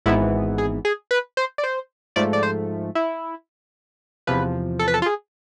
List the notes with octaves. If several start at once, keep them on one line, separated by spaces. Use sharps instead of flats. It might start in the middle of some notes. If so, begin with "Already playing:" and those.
G#1 G#2 E3 B3 E4
G#4
G#4
B4
C5
D5
C5
G#2 F3 A3 D5
D5
C5
E4
E2 C3 F3 B4
A4
B4
A4
F4
G#4